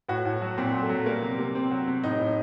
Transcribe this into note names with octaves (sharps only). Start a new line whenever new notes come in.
A2 F#4
A2
F#3
A#2 C4
F#3
A3
F#3
G3 A#3
C3
C3
C3 C4
F#3
C3
A2 D#4
A2